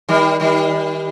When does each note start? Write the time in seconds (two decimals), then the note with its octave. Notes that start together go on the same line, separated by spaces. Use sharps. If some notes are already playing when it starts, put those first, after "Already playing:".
0.09 D#3 G3
0.40 D#3 G3